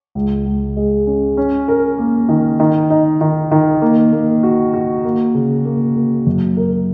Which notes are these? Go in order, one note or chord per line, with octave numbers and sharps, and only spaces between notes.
C#2
C#2
G#3
C#4
C#4
A#4
A#3
D#3
D#3
D#4
D#3
D#3
A#3
A#3
F#4
F#4
A#3
C#3
A#3
A#3
F#2
A#4